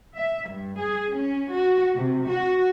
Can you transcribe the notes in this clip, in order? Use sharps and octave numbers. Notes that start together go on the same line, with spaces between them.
E5
G2
G#4
C#4
F#4
C3
F#4